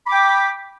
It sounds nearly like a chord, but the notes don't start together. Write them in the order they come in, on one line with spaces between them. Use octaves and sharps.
B5 D6 G5